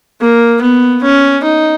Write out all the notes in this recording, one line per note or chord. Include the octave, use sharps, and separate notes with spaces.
A#3
B3
C#4
D#4